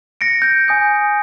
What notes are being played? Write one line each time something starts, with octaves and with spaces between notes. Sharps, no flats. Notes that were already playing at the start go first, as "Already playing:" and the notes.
A#6 C#7 D7
G6 D7
G#5 D#6 G6